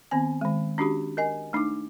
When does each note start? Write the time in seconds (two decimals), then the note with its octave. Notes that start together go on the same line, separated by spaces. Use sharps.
0.11 D#3 B3 C4 G#5
0.41 D#3 G#3
0.78 C#4 D4 F#4 G4 B5
1.17 A#4 D#5 G#5
1.53 A3 D4 D#4 D6